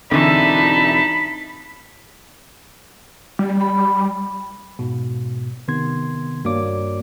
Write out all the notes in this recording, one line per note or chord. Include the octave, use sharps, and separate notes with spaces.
E1 D3 E3 C4 D#4 A5 B5
G3
B5
G#2 B2
C3 D#3 B3 C6 G#6
G2 A#3 F#4 C#5 D5 D6